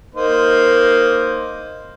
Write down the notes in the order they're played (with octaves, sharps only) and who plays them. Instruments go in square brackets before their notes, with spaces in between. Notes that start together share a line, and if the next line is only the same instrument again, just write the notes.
[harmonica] A#3 D#4 C5